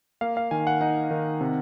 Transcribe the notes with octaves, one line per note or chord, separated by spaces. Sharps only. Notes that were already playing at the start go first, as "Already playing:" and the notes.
A#3 F5
F5
D#3 G#5
F#5
D#4 F#5
D#3
C3